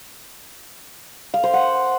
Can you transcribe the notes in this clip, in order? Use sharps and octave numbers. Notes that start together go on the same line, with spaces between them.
F5
C5
F#5